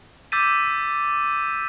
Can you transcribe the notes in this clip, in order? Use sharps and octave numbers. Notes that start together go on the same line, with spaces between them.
D6 E6 G6 A6 B6 D#7